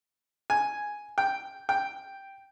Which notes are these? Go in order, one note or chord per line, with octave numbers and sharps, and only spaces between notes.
G#5
G5
G5